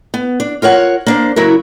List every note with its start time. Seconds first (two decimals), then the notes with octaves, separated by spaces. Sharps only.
0.14 B3
0.40 D4
0.62 F4 A#4 C#5 F#5
1.06 A#3 D4 C5
1.36 C#3 F#3 E4 F#4 A#4